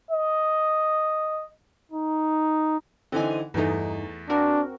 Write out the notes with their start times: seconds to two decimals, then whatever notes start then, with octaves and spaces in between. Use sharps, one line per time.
0.11 D#5
1.92 D#4
3.12 D3 E3 C4 D#4 G#5
3.54 E2 G2 E3 A3 D#4
4.29 C4 D4 F#4 A#4